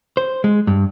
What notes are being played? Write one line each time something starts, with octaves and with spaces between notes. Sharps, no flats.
C5
G#3
G2